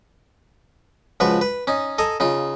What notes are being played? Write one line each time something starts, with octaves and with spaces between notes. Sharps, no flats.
C#2 F3 F#4 B4 C#6
B4
C#4 D#4
A4 D#5 G#5 A#5
C#3 D#4 F4